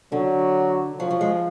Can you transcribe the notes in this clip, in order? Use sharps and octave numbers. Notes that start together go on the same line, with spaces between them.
D3 F#3
F3 F#3
F#3
G#3